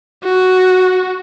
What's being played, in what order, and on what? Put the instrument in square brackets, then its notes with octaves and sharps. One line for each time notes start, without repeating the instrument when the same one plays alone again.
[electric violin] F#4